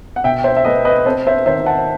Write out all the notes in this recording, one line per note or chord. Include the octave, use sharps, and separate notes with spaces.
F#5
B2 E5 G5
C5 E5
E5
A3 B4 D#5
B4 D#5
C4 A4 C5
C5 E5
D#3 C5 E5
F#5 A5